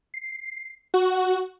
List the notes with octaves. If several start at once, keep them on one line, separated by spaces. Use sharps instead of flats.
C7
F#4